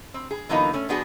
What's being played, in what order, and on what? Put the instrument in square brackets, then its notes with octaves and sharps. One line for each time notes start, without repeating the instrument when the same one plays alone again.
[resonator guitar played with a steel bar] C4
G#4
D3 E3 F#3 A#3 B3 D#4
A3 C#4
F3 G3 B3 D4 F#4 G#4